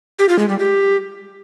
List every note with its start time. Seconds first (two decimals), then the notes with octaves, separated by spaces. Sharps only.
0.19 G4
0.29 F4
0.39 G#3
0.49 G3
0.59 G4